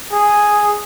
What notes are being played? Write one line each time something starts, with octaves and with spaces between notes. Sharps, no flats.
G#4